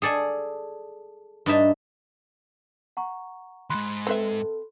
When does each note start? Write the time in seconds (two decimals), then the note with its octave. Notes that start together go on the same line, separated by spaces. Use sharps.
0.02 G#4 A4 D5 G#5
1.46 G2 D#4 E5 A5
2.97 F#5 A#5 C#6
3.70 D#2 G#2 B5 C6 F#6
4.07 C4 A4 B4 E5